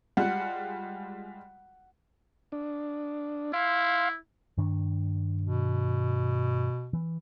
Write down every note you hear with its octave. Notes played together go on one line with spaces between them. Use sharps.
G3 G#3 F4 F#5
D4
E4 F5 C6
G2 D#3 D4
B2
E3